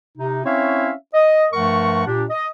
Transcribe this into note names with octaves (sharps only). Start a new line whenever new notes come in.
C3 D#4
C4 C#4 E4 C#5 E5 F5
D#5
G2 F3 A3 A#4 F#5 C#6
A#2 D4 G4
D#5